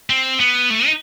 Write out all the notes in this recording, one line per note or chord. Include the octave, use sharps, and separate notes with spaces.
C4
B3
A3
D#4